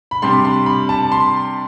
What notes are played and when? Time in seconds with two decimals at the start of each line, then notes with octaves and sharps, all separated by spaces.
0.11 B5
0.22 C3 G3 D4 C6
0.45 C6
0.66 B5
0.89 A5
1.12 C6